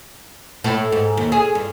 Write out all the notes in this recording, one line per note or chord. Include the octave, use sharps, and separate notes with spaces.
A2
G#2
D#2
G#4
G2